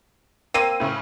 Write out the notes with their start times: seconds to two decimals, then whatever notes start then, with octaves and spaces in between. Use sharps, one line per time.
0.54 A#3 C4 E6 D#7
0.80 A2 C#3